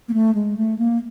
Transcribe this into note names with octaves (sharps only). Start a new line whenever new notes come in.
A#3
A3
G#3
A3
A#3